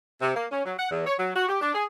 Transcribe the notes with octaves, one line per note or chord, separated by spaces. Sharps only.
C3
A#3
C#4
F#3
F#5
E2
C#5
F#3
F#4
G4
D4
G#4